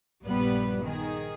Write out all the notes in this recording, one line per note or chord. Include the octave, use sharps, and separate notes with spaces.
A#1 G2 G3 B3 B4
D#3 G#4